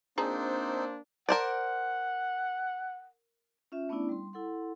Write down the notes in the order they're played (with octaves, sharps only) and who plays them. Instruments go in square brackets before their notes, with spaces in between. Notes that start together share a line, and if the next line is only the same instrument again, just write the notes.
[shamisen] F3 G#4 A#5 [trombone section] A#3 D4 [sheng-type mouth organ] C4 D#4 [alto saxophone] C5
[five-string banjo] A#4 C5 D5 [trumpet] F#5
[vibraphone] C#4 F4 E5
A3 B3 C#4 D4 E4 D5
G3 C6
E4 A4 F#5 C6